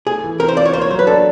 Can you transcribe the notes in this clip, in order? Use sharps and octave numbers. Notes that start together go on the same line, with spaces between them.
A3 G#4
E3
C4 A#4
C5
F4 D5
C#5
A#3 C5
C#5
F#3 C5
B4
D4 A4